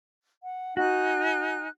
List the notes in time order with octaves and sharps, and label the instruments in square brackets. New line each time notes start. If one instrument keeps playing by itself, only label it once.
[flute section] F#5
[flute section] D#4 G#5 F#6 [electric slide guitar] F#4